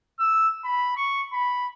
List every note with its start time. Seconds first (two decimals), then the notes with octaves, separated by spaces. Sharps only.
0.19 E6
0.65 B5
0.97 C#6
1.33 B5